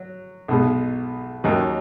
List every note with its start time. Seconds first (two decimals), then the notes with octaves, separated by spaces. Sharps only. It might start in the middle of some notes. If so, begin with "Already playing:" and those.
Already playing: F#3
0.48 B1 B2 G#3
1.44 D#2 D#3 F#3 C#4